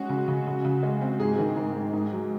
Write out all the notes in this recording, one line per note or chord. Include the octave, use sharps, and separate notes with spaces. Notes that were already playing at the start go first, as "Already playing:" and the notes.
Already playing: G#3 C#4 F#4
C#3
C#3
C#3
C#3
G#3
C4
G#2 G#4
D#3
G#2
G#2
G#2
F#3